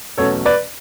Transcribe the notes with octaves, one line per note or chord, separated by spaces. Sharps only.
E2 B2 F#3 A3 C#4 A4 C#5
B4 D5